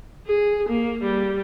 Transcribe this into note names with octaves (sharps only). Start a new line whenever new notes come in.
G#4
A#3
G3